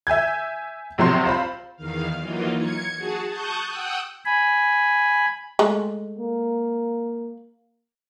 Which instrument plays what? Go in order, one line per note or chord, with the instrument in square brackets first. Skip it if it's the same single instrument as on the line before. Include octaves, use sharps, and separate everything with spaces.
[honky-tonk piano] E5 G#5 G6 G#6
A#1 C3 F#3 C5 C6
F4 C5 B5
[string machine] E2 D#3 F5
E3 F#3 A#3 D#4 F4
G#6 C#7
F#4 G#4 A5
A5 C#6 D#6 F#6 G6
F#5 G5 D#6 E6 F#6
[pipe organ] G#5 B5
[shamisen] G#3 A3
[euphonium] A#3